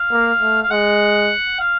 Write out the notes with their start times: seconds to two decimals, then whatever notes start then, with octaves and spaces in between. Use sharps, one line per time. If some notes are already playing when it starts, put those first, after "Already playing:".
Already playing: F5
0.12 A#3
0.41 A3
0.62 F5
0.70 G#3 F#5
1.59 F5